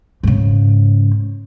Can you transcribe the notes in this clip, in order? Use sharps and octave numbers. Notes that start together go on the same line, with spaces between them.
G#2 C#3